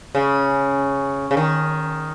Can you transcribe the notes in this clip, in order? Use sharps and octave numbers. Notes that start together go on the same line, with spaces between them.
C#3
C#3
D#3